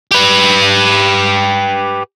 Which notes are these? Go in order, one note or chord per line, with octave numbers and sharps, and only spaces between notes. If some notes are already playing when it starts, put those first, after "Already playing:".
G4 B4